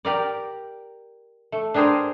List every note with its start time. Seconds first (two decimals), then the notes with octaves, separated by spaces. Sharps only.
0.05 G4 A#4 D5
1.52 A3
1.74 D4 G4 G#4 A#4 C5